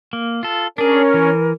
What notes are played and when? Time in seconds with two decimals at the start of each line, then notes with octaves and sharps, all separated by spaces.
0.13 A#3
0.43 F4 A4
0.78 C#4 D4 G#4 A#4
1.14 E3